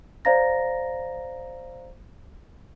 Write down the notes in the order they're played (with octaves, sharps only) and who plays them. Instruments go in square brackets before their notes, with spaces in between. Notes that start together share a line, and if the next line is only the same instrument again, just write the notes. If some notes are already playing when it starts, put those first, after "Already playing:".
[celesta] C5 D5 F5 A#5 A6 A#6